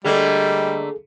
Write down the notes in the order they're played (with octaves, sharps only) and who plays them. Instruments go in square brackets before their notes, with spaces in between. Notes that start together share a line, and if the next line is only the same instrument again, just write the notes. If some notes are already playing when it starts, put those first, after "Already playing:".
[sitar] D3 A3 A#3 [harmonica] G3 [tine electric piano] G#4 A4 [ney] D#5